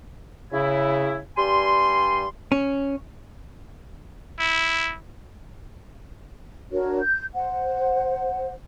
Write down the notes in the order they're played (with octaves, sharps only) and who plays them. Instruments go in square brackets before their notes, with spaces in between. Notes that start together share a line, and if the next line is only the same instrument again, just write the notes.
[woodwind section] C#3 E4
G2 G3 G#5 C6
[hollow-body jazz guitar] C#4
[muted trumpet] E4
[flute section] D4 F#4 A#4 C#5
G6
C5 F#5